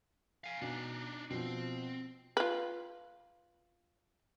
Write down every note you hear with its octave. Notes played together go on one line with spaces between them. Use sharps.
F5 G#5
B2 D4 D#4
B2 F3 C4
F4 B4